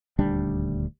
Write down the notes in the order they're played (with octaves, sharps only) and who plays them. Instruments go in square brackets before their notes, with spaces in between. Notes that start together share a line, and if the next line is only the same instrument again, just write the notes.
[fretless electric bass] D#1 D2 G3 D4